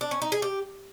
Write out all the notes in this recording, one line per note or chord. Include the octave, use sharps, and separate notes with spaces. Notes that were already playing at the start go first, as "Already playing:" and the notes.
D4
C#4
D#4
G#4
G4